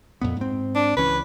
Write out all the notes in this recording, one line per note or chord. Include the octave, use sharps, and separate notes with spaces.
F2 A#2 B3
G#2 C4
D4
C#2 E3 C#4 B4